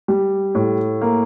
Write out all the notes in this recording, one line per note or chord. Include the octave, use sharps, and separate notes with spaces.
G3
A2
A#3